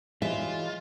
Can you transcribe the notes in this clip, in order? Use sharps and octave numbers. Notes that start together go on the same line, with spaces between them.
E3 F#3 G#3 F4 E5